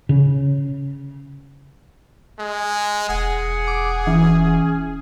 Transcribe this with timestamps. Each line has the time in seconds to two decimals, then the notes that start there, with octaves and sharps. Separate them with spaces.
0.09 C#3
2.39 G#3
3.09 E1 G#4 F#5
3.68 D6
4.07 E3 C#4